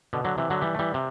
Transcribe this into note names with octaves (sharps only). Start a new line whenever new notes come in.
B2 D3
D3 F#3
C3 E3
D3 F#3
E3 G3
A3
E3 G3
C3